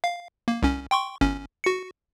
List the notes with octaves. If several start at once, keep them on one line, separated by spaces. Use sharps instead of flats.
F5
A#3
C2 C#4
G5 C6 C#6
G1 C#4
F#4 C#7